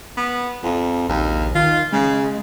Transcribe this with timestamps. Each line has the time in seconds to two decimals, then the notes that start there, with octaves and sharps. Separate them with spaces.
0.17 B3
0.63 F2
1.09 A#1 D#2
1.55 D#3 F4
1.92 C#3 G#3